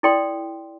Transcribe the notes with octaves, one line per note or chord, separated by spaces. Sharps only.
E4 A4 D5 G5 C6